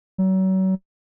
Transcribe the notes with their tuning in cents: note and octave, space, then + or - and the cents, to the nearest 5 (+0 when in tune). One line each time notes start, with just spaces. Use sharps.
F#3 +35